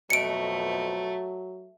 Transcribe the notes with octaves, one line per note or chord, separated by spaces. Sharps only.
F2 B2 F#3 A3 C#7 D7